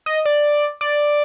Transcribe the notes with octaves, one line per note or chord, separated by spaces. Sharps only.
D#5
D5
D5